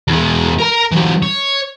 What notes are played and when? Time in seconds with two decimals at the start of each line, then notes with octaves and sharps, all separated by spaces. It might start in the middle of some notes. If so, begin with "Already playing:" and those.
0.08 E2 G#3
0.58 A#4 A#5
0.92 E3 F#3
1.23 C#5